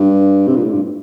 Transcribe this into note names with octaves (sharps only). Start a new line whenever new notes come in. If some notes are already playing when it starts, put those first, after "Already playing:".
Already playing: G2
C3
A#2
A2
G2